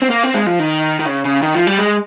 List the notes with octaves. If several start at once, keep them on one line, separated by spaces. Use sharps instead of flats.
C4
A#3
C4
G#3
F3
D#3
D#3
C#3
C#3
D#3
F3
G3
G#3